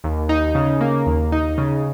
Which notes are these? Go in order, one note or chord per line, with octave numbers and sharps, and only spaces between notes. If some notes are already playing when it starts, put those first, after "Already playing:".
D#2
D#4
C#3
A#3
D#2
D#4
C#3